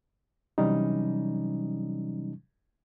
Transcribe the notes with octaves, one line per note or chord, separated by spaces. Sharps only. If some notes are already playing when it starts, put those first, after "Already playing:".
C3 E3 F#3 G3 C#4 D#4